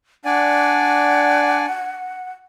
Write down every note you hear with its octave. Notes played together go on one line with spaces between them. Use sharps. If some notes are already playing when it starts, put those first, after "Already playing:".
D4 D5 F#5 G#5